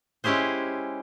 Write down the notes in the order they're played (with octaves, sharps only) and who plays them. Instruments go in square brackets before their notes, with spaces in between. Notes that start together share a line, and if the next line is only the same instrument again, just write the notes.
[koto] G#3 C#4 E4 G4 G#4 C5